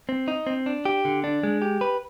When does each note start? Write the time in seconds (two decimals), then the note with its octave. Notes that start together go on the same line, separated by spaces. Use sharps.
0.09 C4
0.28 D#4
0.47 C4
0.66 D4
0.86 G4
1.05 D3
1.24 D4
1.43 G#3
1.62 G4
1.81 B4